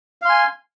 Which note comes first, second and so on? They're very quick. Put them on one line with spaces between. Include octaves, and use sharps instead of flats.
F5 C6 G#5